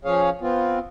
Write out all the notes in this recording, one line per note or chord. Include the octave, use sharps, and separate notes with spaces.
F3 C#4 G#4 C#5 F5
B3 C4 F4